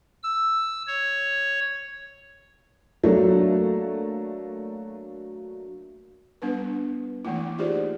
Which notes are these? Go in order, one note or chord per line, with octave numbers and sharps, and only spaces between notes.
E6
C#5
F#3 A3 A#3 D4
G3 B3 D4 B4
E3 A3 A#3 E4
D#4 F4 G4 G#4 C5 D5